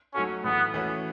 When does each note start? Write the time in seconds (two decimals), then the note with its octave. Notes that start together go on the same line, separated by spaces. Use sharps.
0.14 F#3 A3 C#4 D#4 F#4 A4
0.43 A2 E3 A3 B3
0.74 E3 A3 C#4 F#4 B4